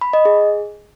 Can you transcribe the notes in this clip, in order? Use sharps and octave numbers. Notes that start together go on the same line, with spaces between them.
B5
D#5
G#4